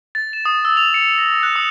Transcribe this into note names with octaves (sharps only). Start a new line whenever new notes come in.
A6
E7
D#6
E6
F7
C#7
A#6
F#6
D#6